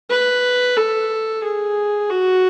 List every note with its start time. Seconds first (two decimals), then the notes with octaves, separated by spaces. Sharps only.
0.10 B4
0.77 A4
1.43 G#4
2.09 F#4